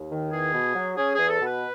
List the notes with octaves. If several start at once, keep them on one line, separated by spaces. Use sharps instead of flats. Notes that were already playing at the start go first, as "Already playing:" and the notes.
Already playing: D#2
D#3
E2 G#4
B2
F#3
C#4 G#4
G#4
E2
A4
B2
B4